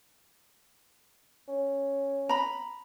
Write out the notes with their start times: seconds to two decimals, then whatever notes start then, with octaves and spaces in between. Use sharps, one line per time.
1.48 C#4
2.29 A#5 B5